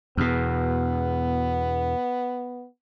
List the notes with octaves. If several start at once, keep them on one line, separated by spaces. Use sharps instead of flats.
E2 B2 B3